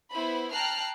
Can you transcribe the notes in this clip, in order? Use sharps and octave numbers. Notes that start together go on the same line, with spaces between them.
B3 E4 C5 B5
G5 A5 A#5 F6 F#6 C7